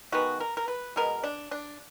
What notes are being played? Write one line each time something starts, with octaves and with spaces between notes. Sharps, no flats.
D#3 G#3 B3 F#4
A#4
A#4
B4
B2 G#3 B3 A#4
D4
D4